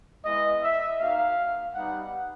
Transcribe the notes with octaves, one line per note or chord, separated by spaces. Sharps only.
G#3 B3 E4 D#5
E5
A#3 D#4 F#4 F5
G3 B3 D#4 G4 F#5